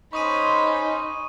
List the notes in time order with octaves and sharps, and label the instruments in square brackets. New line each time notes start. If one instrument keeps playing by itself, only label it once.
[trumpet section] G#3 C#4 C5 [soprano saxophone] D#4 [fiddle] B5 [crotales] C#6 D#6 D#7